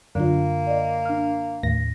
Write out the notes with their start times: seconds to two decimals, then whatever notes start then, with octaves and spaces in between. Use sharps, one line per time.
0.15 F#2 D3 A#3 D4 F4
0.67 D5 D#5
1.05 D4 F6
1.63 D#2 A2 A#6